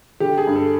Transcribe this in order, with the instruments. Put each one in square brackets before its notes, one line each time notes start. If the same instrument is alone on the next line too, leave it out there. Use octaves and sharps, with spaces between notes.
[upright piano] D3 G4
G#4
G2
A4